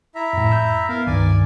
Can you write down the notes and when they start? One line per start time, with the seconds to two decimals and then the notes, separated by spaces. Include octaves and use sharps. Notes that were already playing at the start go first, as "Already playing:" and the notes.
0.15 E4 E5 A#5
0.33 F2 A2
0.52 E6 G6
0.89 B3 A#4 F5
1.07 C#2 G2 D#3 D5 G#5